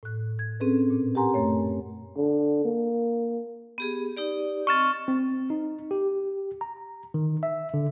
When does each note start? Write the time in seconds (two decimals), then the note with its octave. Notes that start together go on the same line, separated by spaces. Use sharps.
0.03 A2 F#6
0.39 G#6
0.60 C4 C#4 G#4 A4 B4
0.90 A#2
1.15 G4 A#4 F#5 G#5 A#5 C6
1.34 F#2 A3 C#5
2.17 D3
2.65 A#3
3.78 B3 G4 G#4
4.17 D#4 G4 D5
4.67 C4 D#5 C#6 F6 A6
5.08 C4
5.50 D#4
5.91 G4
6.61 A#5
7.14 D#3
7.43 E5
7.74 D3